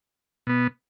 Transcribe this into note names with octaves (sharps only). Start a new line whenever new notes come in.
B2 B3